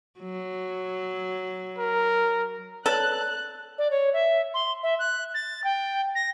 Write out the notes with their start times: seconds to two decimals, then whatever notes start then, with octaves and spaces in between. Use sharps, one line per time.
0.20 F#3
1.78 A#4
2.86 A4 B4 C#5 D5 F#6
3.78 D5
3.91 C#5
4.13 E5
4.54 C6
4.83 E5
4.99 F#6
5.34 A6
5.64 G5
6.15 A#6